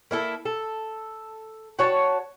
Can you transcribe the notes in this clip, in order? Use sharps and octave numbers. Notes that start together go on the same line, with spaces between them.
A#3 E4 A4
A4
F#4 C#5 A5